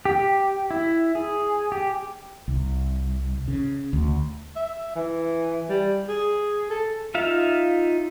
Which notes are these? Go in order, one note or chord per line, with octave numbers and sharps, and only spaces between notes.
G4
E4
G#4
G4
C2
C#3
D2
E5
E3
G3
G#4
A4
D#4 F4 E5 F5